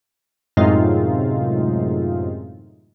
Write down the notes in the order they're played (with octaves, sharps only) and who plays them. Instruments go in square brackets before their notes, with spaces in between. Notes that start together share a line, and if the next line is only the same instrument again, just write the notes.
[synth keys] F#2 A2 C3 G#3 D#4 F4